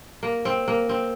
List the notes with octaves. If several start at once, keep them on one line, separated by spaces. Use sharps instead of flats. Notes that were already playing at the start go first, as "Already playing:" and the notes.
A#3
C4
A#3
C4